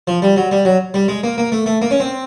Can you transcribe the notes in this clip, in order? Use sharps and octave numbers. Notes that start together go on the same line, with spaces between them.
F3
G3
F#3
G3
F#3
G3
G#3
A#3
A#3
A3
A3
A#3
C#4
C4